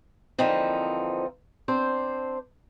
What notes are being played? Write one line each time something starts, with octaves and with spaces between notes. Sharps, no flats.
D3 E3 F3 A#3 C4 D#4
C4 D4 C5